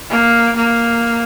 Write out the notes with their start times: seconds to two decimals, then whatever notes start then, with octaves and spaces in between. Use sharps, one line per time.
0.10 A#3
0.57 A#3